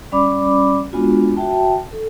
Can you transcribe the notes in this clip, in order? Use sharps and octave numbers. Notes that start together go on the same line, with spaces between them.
G3 C#4 D5 B5 D6
G#3 B3 D4 F4 F#4
F#4 E5 G5 A5
A4